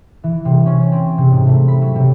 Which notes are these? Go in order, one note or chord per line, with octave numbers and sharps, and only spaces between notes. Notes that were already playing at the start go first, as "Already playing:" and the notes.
E3
C3
C#4
C4
C3
G#2
A3
B5
F#3
C3